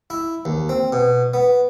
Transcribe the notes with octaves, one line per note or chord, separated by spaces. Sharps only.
E4
D#2
C4
B2
B3